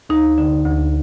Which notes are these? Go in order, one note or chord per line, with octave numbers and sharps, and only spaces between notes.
D2 D#4
D3
D2